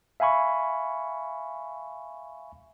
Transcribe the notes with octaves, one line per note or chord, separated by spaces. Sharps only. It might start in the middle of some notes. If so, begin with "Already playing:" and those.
E5 F5 G#5 B5 C#6